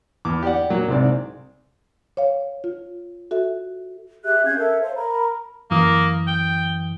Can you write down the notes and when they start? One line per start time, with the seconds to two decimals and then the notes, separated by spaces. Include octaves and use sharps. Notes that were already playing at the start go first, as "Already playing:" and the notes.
0.25 E2 D6
0.43 G4 D5 F#5
0.70 A#2 F#3
0.88 C2 G#2 G#3 C4 D5
2.17 C#5 F5
2.64 F4
3.31 F#4 A4 E5
4.24 G4 G#4 E5 F#6
4.45 C#4 F5 G6 G#6
4.57 A4 A#4 E5
4.82 C5 C#5 F5
4.96 A#4 A#5 B5
5.71 F#2 E3 A#3 D#6
6.27 G5